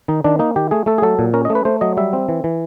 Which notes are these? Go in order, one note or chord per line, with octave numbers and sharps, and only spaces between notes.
D#3 D#4
D#3 D4
A#3 D#4
D#3 G4
A3 G#4
A3 A4
G#4
F#3 A4
A#2
C#4 A#4
D#5
A3
B4
A3 C5
F#3 D#5
G3 E5
C4
E3
E3